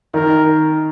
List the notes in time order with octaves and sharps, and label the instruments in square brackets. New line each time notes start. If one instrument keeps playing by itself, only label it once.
[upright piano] D#3 [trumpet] A#4